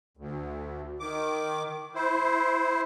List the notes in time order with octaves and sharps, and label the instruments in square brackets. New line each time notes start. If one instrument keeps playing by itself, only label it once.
[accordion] D2
D#3 D6
E4 C5